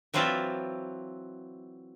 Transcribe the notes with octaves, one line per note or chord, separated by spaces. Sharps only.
E3 F#3 C4 F4 D5 E5